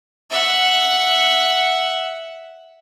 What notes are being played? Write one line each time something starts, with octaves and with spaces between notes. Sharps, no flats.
E5 F#5